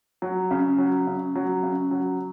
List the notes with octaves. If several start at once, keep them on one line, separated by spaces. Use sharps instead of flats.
F#3
C#3
F#3
C#3
F#3
C#3
F#3